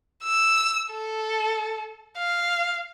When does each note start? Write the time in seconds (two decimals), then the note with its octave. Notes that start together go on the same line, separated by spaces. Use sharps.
0.23 E6
0.91 A4
2.17 F5